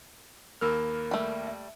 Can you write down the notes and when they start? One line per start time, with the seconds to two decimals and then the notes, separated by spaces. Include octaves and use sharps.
0.61 D#2 A#3 A#4 B5 E6 F6
1.11 G3 A3
1.47 E5